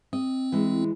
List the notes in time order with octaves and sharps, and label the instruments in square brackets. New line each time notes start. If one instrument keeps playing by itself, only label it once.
[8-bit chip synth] C4 [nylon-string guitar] D#5
[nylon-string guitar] E3 G#3